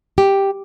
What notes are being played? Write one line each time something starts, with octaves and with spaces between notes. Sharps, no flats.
G4